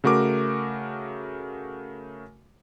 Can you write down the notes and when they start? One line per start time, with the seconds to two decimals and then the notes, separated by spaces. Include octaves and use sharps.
0.04 C#3 A3 F#4 A#4 D6